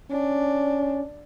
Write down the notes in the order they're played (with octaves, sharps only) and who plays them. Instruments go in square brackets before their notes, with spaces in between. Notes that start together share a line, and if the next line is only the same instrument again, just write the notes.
[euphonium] C#4 [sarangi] D4